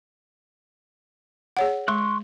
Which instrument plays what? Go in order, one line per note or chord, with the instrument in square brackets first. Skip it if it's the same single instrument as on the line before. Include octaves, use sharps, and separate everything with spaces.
[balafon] G#4 C#5 F#5
[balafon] G#3 [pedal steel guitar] C6 C#6 F#6